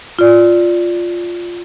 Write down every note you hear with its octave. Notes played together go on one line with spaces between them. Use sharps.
F4 D5